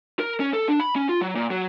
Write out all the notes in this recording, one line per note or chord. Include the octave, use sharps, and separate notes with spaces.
A#4
C#4
A4
D4
B5
C#4
F4
F#3
A#2
F#3